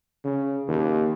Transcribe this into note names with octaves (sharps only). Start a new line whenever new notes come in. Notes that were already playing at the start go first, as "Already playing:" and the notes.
C#3
D#2